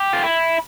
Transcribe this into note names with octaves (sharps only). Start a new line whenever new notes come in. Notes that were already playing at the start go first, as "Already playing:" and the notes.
Already playing: G4
F4
E4